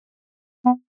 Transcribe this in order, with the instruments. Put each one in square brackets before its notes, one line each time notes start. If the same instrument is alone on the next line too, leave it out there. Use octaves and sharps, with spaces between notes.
[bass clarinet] B3